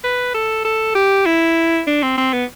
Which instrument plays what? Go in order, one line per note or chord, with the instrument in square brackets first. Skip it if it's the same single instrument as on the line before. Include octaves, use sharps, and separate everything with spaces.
[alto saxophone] B4
A4
A4
G4
E4
D4
C4
C4
B3